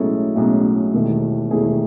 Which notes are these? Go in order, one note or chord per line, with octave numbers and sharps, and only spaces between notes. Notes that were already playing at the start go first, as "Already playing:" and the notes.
Already playing: B1 A2 G#3 C#4 E4 A4
B1 A2 G#3 C#4 E4
E1 D#2 D#3 A3 E4
E1 D#2 D#3 A3 E4 G#4
G#4